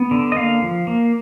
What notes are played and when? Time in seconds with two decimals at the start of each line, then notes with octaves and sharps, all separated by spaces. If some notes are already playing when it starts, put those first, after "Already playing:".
Already playing: B3
0.11 D3
0.32 D#5
0.36 A#3 F5
0.62 F3
0.87 A#3